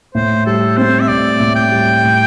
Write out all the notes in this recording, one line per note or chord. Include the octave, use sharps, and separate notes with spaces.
A2 C5
G3 A4
C4 C5
E5
A2 D5
A2
G5
G3
A2